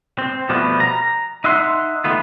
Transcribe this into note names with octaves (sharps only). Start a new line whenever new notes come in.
C4
B2 F3 G3 A3 B3
A#5
D#4 E5 F#5 C6
D#3 A3 B3 F4